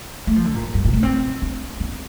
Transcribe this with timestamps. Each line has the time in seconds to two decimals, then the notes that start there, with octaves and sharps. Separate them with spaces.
0.27 A3
0.36 F3
0.45 D3
0.55 A#2
0.74 G2
0.85 A#2
0.93 A3
1.03 C4
1.42 D4
1.80 C4